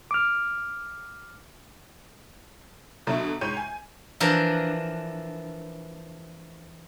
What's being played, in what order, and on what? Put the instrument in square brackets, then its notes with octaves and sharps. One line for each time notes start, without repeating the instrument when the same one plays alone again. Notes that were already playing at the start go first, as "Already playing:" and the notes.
[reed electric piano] D6 F6
[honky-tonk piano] B2 D3 F#3 A3
G#2 C#5 G5 G6 D#7
G#5
[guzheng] E3 F3 D4 A#4